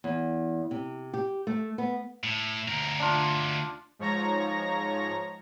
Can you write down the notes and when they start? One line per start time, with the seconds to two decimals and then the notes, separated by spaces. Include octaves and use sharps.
0.04 E2
0.71 C3
1.13 G4
1.47 A3
1.78 B3
2.24 A2
2.68 D2 A#4
3.00 D4 F4
3.99 G#2 F3 C#5 A#5 A#6